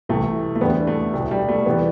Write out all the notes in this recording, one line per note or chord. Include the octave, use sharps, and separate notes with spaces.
C2 C3 E3 A3
A3
E2 D3 G3 B3
A3
C2 B2 G3
G3
A3
E2 C3 E3 G3 B3